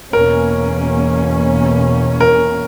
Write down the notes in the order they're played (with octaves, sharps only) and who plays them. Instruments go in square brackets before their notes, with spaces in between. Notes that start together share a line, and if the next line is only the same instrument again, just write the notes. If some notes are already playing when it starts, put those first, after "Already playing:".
[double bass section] E2 B2 A#3 C#4 [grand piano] A#4
[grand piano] A#4